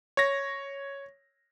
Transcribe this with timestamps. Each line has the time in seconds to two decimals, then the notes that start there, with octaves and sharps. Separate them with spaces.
0.17 C#5 A#6